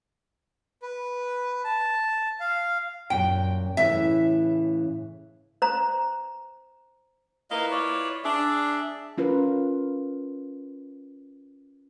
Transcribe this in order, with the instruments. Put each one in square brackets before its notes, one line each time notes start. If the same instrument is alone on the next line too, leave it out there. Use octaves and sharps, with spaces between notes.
[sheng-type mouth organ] B4
A5
F5
[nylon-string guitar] F#2 A#2 [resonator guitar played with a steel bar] G5
[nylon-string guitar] A2 C#3 E3 [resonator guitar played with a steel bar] E5
[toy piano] C5 A#5
[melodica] A#3 D#5 F5 [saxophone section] E4 F4 B4
[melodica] C#5 D5
[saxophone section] D4 [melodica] G#4 D5 E5
[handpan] C#4 F4 A#4 B4